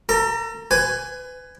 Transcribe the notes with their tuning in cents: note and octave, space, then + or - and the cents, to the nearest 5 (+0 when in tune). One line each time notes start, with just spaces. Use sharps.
A4 +40 A#5 +5
B4 +30 G#5 +0